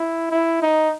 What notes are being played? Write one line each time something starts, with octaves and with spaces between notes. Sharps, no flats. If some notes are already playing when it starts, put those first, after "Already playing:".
Already playing: E4
E4
D#4